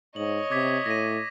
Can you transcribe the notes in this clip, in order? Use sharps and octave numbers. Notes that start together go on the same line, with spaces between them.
G#2 C#5 D#5 F#7
C3 D6 G#6 B6
A2 A#6 D#7